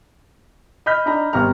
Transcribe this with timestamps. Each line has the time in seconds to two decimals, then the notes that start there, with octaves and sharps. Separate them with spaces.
0.86 D#5 B5 F6 G6 B6
1.06 D4 D#4 A#5 B5
1.33 G#1 G3 B3 A#5 F6